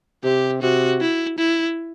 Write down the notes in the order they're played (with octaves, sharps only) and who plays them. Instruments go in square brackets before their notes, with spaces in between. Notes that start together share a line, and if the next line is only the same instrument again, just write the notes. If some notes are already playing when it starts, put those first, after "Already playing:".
[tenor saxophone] C3 [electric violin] G4
[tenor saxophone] C3 [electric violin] F#4
[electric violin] E4
E4